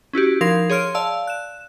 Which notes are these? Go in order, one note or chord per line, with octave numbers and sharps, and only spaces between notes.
C#4 E4 F#4 G4
F3 D#4 A#4 G#6 C7
G#4 C#5 C6 F6 D7
D5 F5 A5 E6
F#6 E7